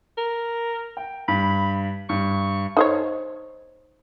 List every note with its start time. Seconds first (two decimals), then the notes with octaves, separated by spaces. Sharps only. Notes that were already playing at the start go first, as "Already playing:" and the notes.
0.18 A#4
0.97 G5
1.28 G2 B5
2.09 G2 C#6
2.77 D#4 C5 C#5